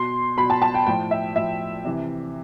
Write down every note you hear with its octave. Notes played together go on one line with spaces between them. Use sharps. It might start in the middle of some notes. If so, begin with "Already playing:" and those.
Already playing: B2 C6
B2 B5
A5
A5
G5
A2 F3 G5
E5
A2 F3 E5
C3 E3